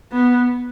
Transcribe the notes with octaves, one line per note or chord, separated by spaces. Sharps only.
B3